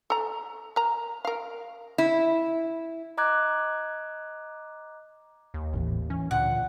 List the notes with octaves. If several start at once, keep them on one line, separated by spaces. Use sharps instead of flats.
A4 A#5
A#4 A#5
A#4 F5
E4
D#5 A#5 D6 F#6 G#6
D#2
G#1 A2 E3
E3 C#4
D2 A#2 F#5